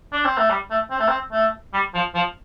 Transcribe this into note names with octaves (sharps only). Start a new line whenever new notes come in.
D4
C4
A3
G3
A3
C4
A3
C4
A3
G3
F3
F3